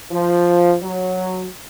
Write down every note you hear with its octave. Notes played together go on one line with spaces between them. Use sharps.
F3
F#3